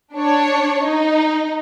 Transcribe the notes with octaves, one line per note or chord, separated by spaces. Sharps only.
D4 C#5
D#4